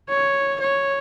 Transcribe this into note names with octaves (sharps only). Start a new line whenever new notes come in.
C#5
C#5